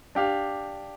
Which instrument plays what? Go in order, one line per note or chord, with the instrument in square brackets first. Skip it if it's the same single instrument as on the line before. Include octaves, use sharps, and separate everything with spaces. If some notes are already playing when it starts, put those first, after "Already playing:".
[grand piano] D4 G4 F5